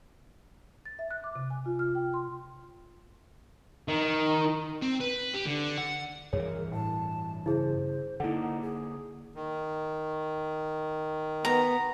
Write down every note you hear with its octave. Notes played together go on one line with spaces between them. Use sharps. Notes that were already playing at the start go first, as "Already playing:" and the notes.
A6
E5
F#6
D6
C3
G#5
F4
F6
G5
C6
D#3
C4
B4
G4
D3
F#5
G2 E3 G#4 A#4 C#5
A2 A5
C#3 E4 G#4 C5
D3 A#3 D#4 E4 A4 F#5
G#4
D#3
B3 A#5